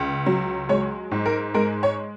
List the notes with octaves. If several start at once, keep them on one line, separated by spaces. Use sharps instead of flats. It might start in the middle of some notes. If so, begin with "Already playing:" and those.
Already playing: C#2
F#3
G#3 C#5
G#2
A#4
G#3 A#4
C#5